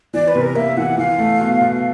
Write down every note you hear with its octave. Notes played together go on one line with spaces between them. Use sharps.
E3 D5
B4
C3
A#4
A#3 E5
E3 F#5
E3 F5
A3
B2
B2